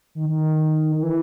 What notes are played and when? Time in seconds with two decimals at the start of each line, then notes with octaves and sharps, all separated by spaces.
0.15 D#3
0.29 D#3
0.96 D#3
1.03 E3